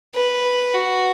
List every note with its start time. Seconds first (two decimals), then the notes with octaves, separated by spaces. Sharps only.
0.15 B4
0.74 F#4